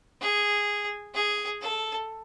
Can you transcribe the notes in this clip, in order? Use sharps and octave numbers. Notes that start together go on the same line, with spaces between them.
G#4
G#4
A4